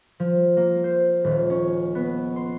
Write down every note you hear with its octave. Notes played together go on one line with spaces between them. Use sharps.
F3
A#3
C5
D#1
C#4
B3
C6